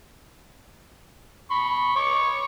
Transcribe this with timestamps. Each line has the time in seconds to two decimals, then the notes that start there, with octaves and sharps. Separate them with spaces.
1.51 B5 C#6
1.96 C#5 C#6 D6